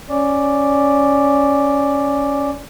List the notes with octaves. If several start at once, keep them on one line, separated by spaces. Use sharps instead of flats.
C#4 D5